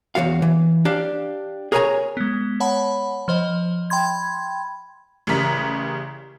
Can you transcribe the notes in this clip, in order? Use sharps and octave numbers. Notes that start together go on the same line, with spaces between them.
E2 D#3 F#4 F5
E3
D4 G4 F5
G#4 A#4 C#5 D5 G#5 A#5
G#3 B3
C#5 F#5 A5 B5
F3 C5 D#5
G5 B5 C6 G#6
A1 C#3 G3 A#4 A#5 B6